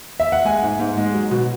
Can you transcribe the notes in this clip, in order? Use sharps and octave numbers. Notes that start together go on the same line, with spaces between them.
E5
F#5
G#3 G#5
G#2
G#2
G#3
F#3
B2